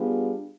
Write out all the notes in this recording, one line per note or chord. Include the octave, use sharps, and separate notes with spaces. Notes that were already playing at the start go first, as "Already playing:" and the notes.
Already playing: G3 B3 D4 F4 G#4